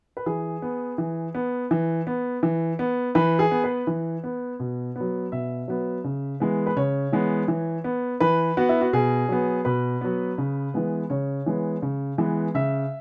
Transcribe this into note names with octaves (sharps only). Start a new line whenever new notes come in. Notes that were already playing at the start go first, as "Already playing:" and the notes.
B4
E3 G#4
B3
E3
B3
E3
B3
E3
B3
E3 B4
G#4
B3
B4
E3
B3
B2
F#3 B3
B2 E5
F#3 B3
C#3
E3 G#3 B3
B4
C#3 C#5
E3 G#3 B3
E3
B3
E3 B4
B3 F#4
E4
F#4
B2 G#4
F#3 B3
B2 B4
F#3 B3
C#3
E3 G#3 B3
C#3 C#5
E3 G#3 B3
C#3
E3 G#3 B3
C#3 E5